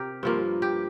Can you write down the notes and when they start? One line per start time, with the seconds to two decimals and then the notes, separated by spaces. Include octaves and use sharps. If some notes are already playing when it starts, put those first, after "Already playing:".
Already playing: C3 G4 A#4
0.23 G2 F3 A#3
0.62 G4